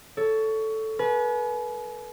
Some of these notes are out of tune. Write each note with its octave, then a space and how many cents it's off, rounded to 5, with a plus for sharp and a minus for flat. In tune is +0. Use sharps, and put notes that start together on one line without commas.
A4 +0 C#5 +20
B4 -25 G#5 +40